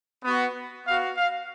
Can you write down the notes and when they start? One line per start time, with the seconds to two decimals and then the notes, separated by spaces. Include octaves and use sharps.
0.24 B3 F#4
0.87 B3 F#4 F5
1.18 F5